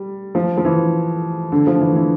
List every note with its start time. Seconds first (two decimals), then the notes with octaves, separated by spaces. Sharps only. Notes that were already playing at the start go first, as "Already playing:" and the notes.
Already playing: G3
0.35 F3
0.58 F3
0.65 E3
1.52 D3
1.67 F3
1.80 E3
1.96 E3